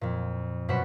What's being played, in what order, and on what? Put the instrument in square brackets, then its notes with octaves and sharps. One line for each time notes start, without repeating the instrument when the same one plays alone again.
[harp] F2 A#2
F#2 B2 C5 F#5 B5 E7